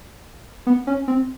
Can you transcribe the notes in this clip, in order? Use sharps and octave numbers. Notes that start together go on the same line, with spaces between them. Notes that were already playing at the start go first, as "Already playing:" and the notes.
B3
C#4
C4